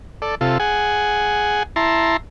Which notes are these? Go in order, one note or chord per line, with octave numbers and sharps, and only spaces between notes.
A4 D5
C3 F4 A4
G#4 F#5 G#5
E4 A5 A#5 C6